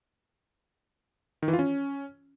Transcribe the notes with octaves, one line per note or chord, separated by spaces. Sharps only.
D#3
E3
F4
C#4